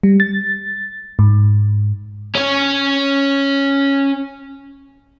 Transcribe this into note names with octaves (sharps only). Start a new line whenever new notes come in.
G3
A6
G#2
C#4 C#5